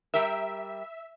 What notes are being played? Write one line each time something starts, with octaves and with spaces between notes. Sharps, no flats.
G3 G4 A#4 E5